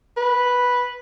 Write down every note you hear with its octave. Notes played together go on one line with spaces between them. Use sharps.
B4